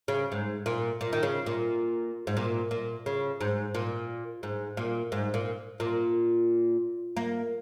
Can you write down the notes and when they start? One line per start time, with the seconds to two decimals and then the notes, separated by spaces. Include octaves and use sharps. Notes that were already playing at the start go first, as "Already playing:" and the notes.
0.08 C#3
0.32 G#2
0.66 A#2
1.01 A#2
1.13 D#3
1.23 C#3
1.46 A#2
2.27 G#2
2.37 A#2
2.71 A#2
3.06 C#3
3.41 G#2
3.75 A#2
4.43 G#2
4.77 A#2
5.12 G#2
5.34 A#2
5.80 A#2
7.17 A#3